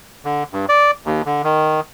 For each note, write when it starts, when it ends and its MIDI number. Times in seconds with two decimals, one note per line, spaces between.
0.25 0.43 50
0.53 0.65 43
0.69 0.91 74
1.06 1.22 39
1.26 1.42 50
1.44 1.80 51